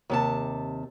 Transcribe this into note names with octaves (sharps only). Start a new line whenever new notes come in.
D#2 C3 A5